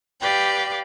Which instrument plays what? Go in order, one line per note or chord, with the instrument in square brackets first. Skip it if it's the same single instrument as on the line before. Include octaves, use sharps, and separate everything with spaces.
[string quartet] G4 B4 D5 F5 G5